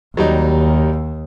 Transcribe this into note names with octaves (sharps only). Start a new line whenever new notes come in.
D#2 F#3 G3 D#4